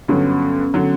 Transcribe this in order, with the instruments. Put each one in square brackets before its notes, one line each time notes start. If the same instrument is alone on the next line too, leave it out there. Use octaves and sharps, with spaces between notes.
[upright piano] G2 D3 F#3 [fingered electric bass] B3 C#4
[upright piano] D3 F#3